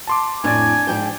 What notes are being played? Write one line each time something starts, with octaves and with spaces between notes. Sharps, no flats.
A5 C6 D6
F2 A2 D4 D5 G#5
G#2 F3 G5